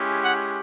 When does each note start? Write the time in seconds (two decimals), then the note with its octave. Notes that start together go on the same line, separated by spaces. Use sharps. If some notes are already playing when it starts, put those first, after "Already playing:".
Already playing: G#3 C#4 E4 G4
0.22 F#5